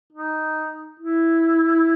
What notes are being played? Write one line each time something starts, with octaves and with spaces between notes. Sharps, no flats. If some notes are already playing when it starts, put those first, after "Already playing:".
D#4
E4